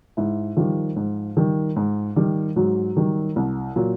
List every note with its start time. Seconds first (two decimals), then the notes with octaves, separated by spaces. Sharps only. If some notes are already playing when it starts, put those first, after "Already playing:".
0.17 G#2 E4
0.57 D#3 F3 G3 F4
0.96 G#2
1.37 D#3 G3
1.76 G#2
2.16 D#3 G3
2.56 G#2 F#3 F#4
2.97 D#3 G3
3.36 C2
3.76 A#2 F#3